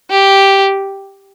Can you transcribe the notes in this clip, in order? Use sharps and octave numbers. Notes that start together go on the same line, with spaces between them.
G4